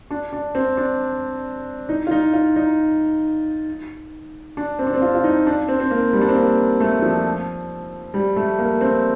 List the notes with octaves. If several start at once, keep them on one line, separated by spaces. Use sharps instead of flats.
D4
D4
C4
D4
D#4
F4
D#4
F4
D#4
D4
C4
D4
C4
F4
F4
D#4
D4
C4
C4
A#3
G3
D4
C4
A#3
A3
F3
G3
A3
A#3
C4